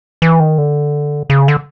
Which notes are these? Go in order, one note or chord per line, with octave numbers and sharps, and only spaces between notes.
E3
D#3
D3
C#3
D3